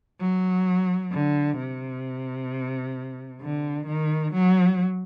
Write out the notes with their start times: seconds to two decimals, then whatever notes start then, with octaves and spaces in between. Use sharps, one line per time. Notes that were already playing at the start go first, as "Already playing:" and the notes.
0.20 F#3
1.12 D3
1.58 C3
3.41 D3
3.86 D#3
4.33 F#3